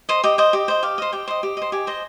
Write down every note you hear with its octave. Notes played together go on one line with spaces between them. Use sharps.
C5 D#5
G4 D#5
C5 D#5
G4
C5 D#5
G4 F5
C5 D#5
G4 G5
C5 D#5
G4
C5 D#5
G4 G#5
C5 D#5